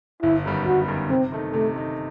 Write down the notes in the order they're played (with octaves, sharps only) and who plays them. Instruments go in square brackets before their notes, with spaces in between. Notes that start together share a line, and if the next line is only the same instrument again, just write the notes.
[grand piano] G1 [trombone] E4
[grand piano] F#2 D#3 G3 B3
[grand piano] G1 [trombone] F#4
[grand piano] F#2 D#3 G3 B3
[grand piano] C3 [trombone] C4
[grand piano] D#3 A3 D#4
[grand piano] C3 [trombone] A3
[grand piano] D#3 A3 D#4